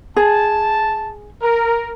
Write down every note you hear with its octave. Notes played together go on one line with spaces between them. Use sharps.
G#4 A5
A#4